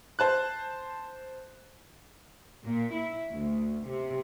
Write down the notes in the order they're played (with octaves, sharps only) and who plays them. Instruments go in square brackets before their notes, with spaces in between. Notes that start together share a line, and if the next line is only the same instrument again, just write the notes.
[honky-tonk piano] C5 A5 F#6
[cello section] A#2
E4
D2
C3